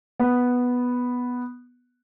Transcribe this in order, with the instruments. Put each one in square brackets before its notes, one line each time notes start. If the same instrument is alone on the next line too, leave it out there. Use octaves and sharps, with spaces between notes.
[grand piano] B3